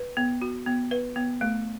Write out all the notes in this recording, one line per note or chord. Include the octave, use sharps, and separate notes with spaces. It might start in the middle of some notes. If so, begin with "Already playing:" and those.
Already playing: B4
B3
F#4
B3
B4
B3
A3